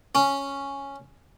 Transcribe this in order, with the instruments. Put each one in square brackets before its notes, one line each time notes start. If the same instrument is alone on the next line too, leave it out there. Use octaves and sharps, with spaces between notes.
[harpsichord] C#4